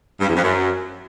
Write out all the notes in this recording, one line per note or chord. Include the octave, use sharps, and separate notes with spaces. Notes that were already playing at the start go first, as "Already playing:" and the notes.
G2
E2
F2
F#2